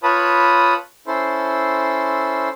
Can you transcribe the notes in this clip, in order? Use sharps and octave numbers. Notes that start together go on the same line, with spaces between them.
F4 B4 C#5 A5 B5 D#6
C#4 E4 A4 C5 C6